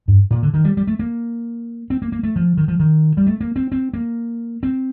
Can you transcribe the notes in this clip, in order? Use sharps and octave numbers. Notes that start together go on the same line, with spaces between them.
G2
A#2
D3
D#3
G3
G3
A3
A#3
C4
A#3
A#3
A3
F3
D#3
F3
D#3
G3
A3
A#3
C4
C4
A#3
C4